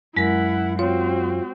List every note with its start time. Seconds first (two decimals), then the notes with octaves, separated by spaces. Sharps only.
0.17 F#2 G#3 E4 A#4 F#5 B6
0.79 C4 F4 F#4 C#5